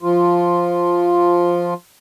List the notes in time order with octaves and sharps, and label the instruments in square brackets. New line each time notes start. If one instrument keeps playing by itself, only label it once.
[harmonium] F3 F4